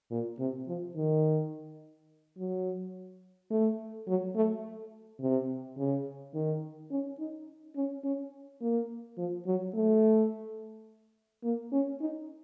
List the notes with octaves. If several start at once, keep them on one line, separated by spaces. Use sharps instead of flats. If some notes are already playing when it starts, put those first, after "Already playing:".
A#2
C3
F3
D#3
F#3
A3
F#3
A3
C3
C#3
D#3
C#4
D#4
C#4
C#4
A#3
F3
F#3
A3
A#3
C#4
D#4